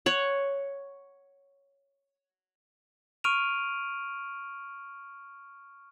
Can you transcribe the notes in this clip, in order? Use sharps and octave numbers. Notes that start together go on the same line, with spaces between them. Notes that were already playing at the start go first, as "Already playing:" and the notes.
C#5 F#5
C#6 F6 D7 D#7 F7